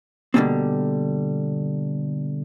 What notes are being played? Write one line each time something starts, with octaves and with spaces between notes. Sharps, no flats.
B2 D3 F3 G3 A#3 C4